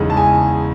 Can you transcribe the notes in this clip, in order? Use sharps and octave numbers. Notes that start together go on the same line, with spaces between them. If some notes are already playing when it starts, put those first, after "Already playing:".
Already playing: E2 C#3 G#3 D#4
A5
G#5